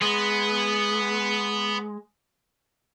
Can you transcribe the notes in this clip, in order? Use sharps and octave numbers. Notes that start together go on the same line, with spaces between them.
G#3 B3